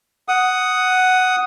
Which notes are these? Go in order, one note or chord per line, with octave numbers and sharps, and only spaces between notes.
F#5 D#6